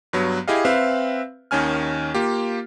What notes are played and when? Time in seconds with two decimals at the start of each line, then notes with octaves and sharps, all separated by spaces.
0.13 G2 F#3 B3
0.48 E4 G4 G#4 D#5 F5
0.65 C4 B4 E5 F5
1.51 D#2 D#3 C#4 G#5 F6
2.14 A#3 F4 G4